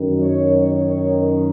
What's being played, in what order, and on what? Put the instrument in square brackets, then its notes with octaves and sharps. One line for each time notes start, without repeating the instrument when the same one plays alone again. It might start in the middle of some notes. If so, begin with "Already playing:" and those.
Already playing: [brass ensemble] F#2 D#3
C#5
C#5
C#5
A#4